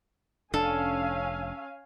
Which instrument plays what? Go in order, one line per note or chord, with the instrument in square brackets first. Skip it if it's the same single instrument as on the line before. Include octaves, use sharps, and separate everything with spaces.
[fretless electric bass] F1 D4 [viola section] C#4 F5 G#5 [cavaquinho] A4